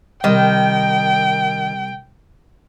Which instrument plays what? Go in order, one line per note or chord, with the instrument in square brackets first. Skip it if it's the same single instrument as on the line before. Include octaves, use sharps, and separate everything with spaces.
[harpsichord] C2 [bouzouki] D#3 [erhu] G5